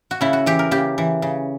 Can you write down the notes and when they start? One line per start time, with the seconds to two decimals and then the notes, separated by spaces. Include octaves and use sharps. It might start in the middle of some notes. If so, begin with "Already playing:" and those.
0.11 F#4
0.21 C#3 E4
0.33 F#4
0.46 E3 G4
0.59 A#4
0.71 C#3 G4
0.98 E3
1.22 C#3